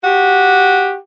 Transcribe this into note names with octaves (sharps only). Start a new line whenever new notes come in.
F#4 G4